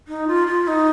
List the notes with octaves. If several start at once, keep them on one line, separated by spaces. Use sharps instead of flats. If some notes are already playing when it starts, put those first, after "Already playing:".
D#4
F4
F4
D#4